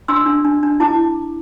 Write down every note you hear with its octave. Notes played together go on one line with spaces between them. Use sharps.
D4 C6 E6
D4
D4
D4
E4 A5 D6